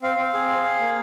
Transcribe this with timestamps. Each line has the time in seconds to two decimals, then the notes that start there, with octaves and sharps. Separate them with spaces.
0.02 C4 F5
0.18 C4
0.34 G#4
0.49 G#4
0.64 G#4
0.80 A#3